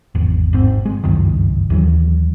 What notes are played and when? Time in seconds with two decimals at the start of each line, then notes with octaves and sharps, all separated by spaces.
0.15 G#1 E2
0.53 G#1 G#2 C4
0.86 G#3
1.04 G1 C#2 F#2 D#3
1.70 D#2 E3 F#3